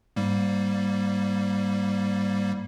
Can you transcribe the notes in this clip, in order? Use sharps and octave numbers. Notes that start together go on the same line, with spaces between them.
G#2 G3 A#3